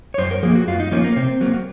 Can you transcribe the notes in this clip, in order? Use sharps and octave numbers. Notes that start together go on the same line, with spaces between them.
C#5
F#2 C5
A#4
F3 A#3 G#4
F#4
F#2 F4
D#4
F3 A#3 C#4
A#3
C3 C4
F#3 A#3